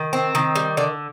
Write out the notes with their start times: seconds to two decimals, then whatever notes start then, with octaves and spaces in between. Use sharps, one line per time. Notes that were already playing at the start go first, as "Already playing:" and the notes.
Already playing: D#3
0.13 C4
0.35 D#3
0.56 G3
0.77 D3 D5